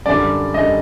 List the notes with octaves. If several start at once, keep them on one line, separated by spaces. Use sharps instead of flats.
F#2 D3 G3 D5
F#2 D3 G3 D#5